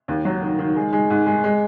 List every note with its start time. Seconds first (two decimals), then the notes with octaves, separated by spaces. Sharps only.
0.08 D#2
0.25 F#3
0.42 D#3
0.59 D#3
0.76 G#3
0.93 G#3
1.10 G#2
1.27 G#3
1.44 G#3